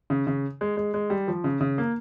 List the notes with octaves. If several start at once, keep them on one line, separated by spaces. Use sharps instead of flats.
C#3
C#3
G#3
G#3
G#3
G3
F3
C#3
C#3
A#3